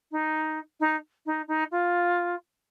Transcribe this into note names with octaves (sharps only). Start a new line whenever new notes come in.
D#4
D#4
D#4
D#4
F4